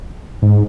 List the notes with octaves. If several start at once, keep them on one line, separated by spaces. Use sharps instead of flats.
G#2